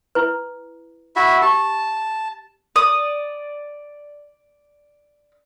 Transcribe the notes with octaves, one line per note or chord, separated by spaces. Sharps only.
E4 B4
E4 F#4 E5
G4 A5
D5 D#6